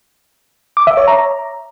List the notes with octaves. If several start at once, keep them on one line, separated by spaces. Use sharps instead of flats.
D6
E5
C#5
A#5